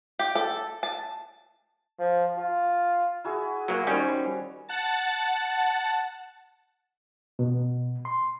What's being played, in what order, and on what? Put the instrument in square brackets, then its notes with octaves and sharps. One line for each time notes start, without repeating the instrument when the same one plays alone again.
[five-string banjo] G4
A4
A5
[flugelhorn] F3
F4
[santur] E4 F#4 G#4
[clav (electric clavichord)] F#3 A#3 [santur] E4
[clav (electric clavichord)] D#3 G3 C#4 [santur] C5 B5
[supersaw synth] F#5 A5 A6
[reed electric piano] B2
C6